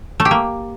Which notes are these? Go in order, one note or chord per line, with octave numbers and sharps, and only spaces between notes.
A3
G4
A#3